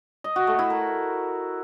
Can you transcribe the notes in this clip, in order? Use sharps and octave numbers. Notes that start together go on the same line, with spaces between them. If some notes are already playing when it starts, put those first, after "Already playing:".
D#5
F#4
A3
E4
A#4